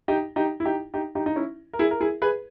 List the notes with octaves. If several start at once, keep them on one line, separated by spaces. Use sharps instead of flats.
D#4 G4
D#4 G4
E4
D#4 G4
D#4 G4
D#4 G4
D#4
C#4 E4
A#4
E4 G#4
A#4
E4 G#4
G#4 B4